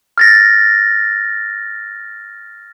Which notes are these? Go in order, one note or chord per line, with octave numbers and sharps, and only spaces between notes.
F6 A6 A#6